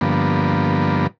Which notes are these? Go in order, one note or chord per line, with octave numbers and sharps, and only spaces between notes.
G2 D3 F3 A#3 B3